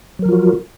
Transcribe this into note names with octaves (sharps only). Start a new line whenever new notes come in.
F3 F#3 F4 F#4 A#4